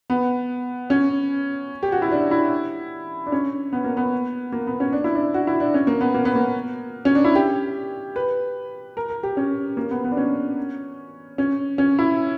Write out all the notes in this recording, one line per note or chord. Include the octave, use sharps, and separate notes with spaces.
B3
C#4
G4
F#4
E4
D4
E4
D4
C#4
B3
A#3
B3
A#3
B3
C#4
D4
E4
D4
F#4
E4
D4
C#4
A#3
B3
A#3
B3
A#3
C#4
D4
E4
G4
B4
A#4
A#4
G4
C#4
A#3
B3
B3
D4
C#4
C#4
C#4
E4